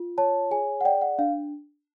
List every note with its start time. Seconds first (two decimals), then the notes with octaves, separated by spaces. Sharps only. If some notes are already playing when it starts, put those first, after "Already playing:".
Already playing: F4
0.18 C#5 A5
0.51 G#4 G#5
0.81 F#5
0.85 D5 G5
1.01 F#5
1.19 D4 F5